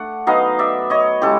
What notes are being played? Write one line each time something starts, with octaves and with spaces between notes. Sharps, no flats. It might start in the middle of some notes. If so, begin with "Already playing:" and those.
Already playing: A3 D4 F#5
F#3 B3 D#4 D#5 F5
D5 E5
C#5 D#5
C#3 E3 G#3 G4 A4